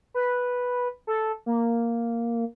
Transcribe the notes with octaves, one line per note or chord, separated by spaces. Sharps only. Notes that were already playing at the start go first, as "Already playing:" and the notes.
B4
A4
A#3